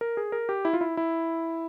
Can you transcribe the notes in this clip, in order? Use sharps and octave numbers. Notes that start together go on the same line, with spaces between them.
A#4
G#4
A#4
G4
E4
F4
E4
E4